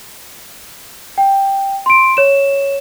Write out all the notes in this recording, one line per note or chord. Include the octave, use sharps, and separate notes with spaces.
G5
C6 D7
C#5 E7